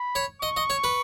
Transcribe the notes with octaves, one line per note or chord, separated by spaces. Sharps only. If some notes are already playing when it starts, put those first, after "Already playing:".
Already playing: B5
C#5
D#5 C#6
D#5
C#5
B4